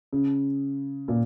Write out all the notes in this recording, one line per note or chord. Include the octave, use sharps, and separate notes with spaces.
C#3
A#2